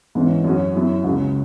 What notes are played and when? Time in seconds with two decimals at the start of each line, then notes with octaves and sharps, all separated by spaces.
0.15 G#2 E3 C#4
0.44 F#2 F#3 C#4 F#4
0.74 F#2 F#3 E4
1.04 C#2 C#3 F#3 C#4